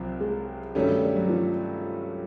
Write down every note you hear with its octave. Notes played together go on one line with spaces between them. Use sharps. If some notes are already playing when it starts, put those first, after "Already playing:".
Already playing: C2 C3 F3 F#3
G#3
G2 D#3 F#3 G3 A3 C#4
G3
F#3
F3